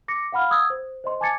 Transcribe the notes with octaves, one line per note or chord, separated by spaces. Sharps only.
D6 A#6 C#7
F5 F#5 B5 F6
D#6 E6 G#6
C5
C5 D#5 C6
G#5 A5 D6 G#6 A6 C#7